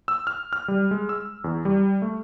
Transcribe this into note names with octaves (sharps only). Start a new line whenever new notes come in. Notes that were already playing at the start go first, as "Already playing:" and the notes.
E6
F6
F6
G3
G#3
E6
E2
G3
A3